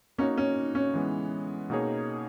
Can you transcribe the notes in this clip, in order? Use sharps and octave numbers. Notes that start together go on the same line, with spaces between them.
A#3 C#4 D#4 F#4
C#4
C#4
E3 G#3 B3
B2 A#3 D#4 G#4 C#5